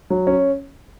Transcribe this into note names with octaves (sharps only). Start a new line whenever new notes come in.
F#3
C#4